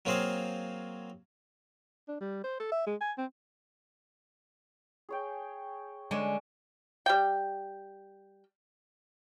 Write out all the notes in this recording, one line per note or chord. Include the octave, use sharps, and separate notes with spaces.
F#3 A#3 C4 G#4 C5 F5
D4
G3
C5
A4
E5
G#3
G#5
C4
G#4 C#5 G5
D3 G#3 C#4 G#5
G3 G5